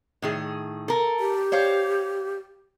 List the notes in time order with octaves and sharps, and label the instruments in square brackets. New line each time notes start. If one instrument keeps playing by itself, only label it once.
[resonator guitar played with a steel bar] A2 D#3 G#4
A4 A#4
[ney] G4
[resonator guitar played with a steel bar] C5 C#5 F5